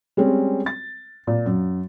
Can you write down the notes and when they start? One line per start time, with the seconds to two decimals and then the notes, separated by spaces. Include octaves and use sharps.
0.17 G3 G#3 C4 C#4
0.66 A6
1.27 A#2
1.46 F#2